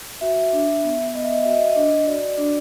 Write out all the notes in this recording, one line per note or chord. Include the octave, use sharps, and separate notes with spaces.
F#4 E5
D4
B3
B3 D#5
E5
D#5
F#4 E5
D#5
E5
D#5
D4
F#4 D5
D4